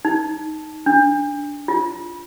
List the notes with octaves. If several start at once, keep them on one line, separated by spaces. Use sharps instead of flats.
D#4
D4
F4